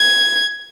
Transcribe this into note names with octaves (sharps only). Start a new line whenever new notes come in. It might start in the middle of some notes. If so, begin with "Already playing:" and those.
Already playing: G#6